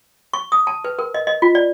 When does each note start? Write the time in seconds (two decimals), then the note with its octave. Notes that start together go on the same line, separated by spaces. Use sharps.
0.34 C#6
0.52 D#6
0.67 A5
0.85 B4
0.99 A#4
1.14 D#5
1.27 D#5
1.42 F4
1.55 D5